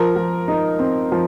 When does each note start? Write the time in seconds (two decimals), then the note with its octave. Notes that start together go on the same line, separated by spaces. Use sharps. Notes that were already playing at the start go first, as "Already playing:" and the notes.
Already playing: F3 A#4
0.16 F3
0.48 D#4
0.79 C4
1.12 F3